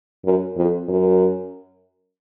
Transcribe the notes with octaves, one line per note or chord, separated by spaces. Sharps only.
F#2
F2
F#2